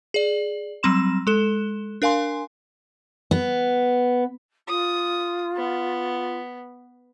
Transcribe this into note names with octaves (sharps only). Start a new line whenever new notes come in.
G#4 D5
F#3 G3 C4 C6 E7
G#3 A4 E7
D4 A#4 F5 G#5 C6
B3
F4 D#6
B3